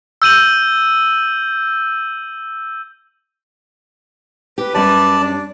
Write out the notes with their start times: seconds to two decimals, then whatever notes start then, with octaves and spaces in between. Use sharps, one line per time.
0.22 E6 G6 D#7 F#7
4.58 G4 B4
4.75 F#2 G3 C#4 D5 A5
5.20 D4